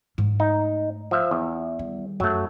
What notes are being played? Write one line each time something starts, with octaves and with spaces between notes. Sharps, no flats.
G#2 A3
D#4
F3 E5
E2
D#3 G3
F#2 F#3 A3